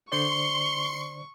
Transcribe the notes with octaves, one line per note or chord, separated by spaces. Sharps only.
D3 C5 D5 C6 C#6 C#7 G7